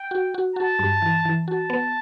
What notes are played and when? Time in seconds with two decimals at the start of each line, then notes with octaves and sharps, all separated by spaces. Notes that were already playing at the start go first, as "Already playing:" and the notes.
Already playing: G5
0.11 F#4
0.34 F#4
0.56 F#4 A5
0.79 G2
1.02 E3
1.25 E3
1.48 F#4 A5
1.70 B3